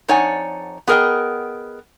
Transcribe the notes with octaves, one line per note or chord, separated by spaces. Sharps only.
F2 D#4 C#5 D5 F#5 G#5
B3 G#4 A#4 B4 D#5 G5